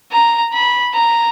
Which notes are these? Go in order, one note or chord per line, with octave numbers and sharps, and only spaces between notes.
A#5
B5
A#5